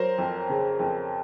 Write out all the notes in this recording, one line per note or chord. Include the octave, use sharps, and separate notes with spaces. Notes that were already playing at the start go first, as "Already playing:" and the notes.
Already playing: F#3 A#4 C5
F2
C#3
F2